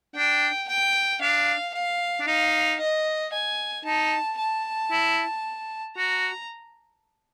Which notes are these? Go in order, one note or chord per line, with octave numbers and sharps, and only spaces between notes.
D4 G5
G5
D4 F5
F5
D4
D#4 F5
D#5
G#5
D#4 A5
A5
E4
F#4 A#5